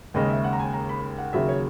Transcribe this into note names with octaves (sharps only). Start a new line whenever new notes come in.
D#2 C#3 G#3 D#5
E5
F#5
A#5
G#5
A#5
B5
F#5
D#2 C#3 F#3 E5
C#5